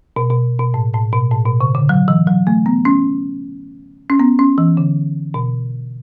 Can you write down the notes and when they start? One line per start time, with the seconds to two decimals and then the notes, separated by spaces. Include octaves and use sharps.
0.16 B2
0.31 B2
0.59 B2
0.74 A2
0.94 A2
1.13 B2
1.31 A2
1.46 B2
1.61 C#3
1.75 D3
1.89 F#3
2.08 E3
2.27 F#3
2.47 A3
2.66 B3
2.85 C#4
4.10 C#4
4.20 B3
4.39 C#4
4.58 E3
4.77 D3
5.34 B2